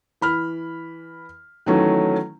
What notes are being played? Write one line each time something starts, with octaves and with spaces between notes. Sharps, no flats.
E3 B5 F6
D#3 E3 F#3 A3 C#4